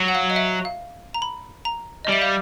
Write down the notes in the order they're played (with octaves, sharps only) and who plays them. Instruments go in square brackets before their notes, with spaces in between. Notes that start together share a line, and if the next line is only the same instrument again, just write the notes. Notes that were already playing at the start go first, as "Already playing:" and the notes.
Already playing: [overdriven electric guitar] F#3
[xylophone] F#5
F5
D#5
E5
F5
A#5
B5
A#5
D#5
[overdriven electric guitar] G3 [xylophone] E5
[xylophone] F5